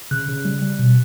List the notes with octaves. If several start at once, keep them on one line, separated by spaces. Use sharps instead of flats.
C#3 F#6
C#3
G3
G3
B2